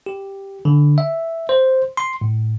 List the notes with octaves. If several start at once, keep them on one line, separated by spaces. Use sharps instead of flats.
G4
D3
E5
C5
C6
A2